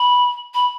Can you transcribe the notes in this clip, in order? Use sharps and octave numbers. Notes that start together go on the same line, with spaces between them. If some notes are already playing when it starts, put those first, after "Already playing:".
Already playing: B5
B5